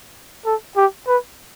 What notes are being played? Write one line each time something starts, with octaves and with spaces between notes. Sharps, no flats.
A4
G4
B4